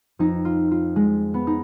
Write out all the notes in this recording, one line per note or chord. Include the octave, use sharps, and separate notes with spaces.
F2 F3 D#4
F4
F4
G#3
B3
D#4